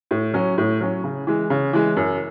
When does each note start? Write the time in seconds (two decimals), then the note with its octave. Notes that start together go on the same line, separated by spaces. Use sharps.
0.11 A2
0.34 F#3 C#4
0.58 A2
0.80 F#3 C#4
1.04 C#3
1.27 E3 G#3
1.50 C#3
1.73 E3 G#3
1.97 F#2